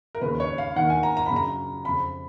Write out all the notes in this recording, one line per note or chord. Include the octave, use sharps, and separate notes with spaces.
A#4
D#2 C#3 B4
C#5
F5
D#2 D#3 F#5
G#5
A#5
A#5
F#2 C#3 B5
A#5
F2 C#3 B5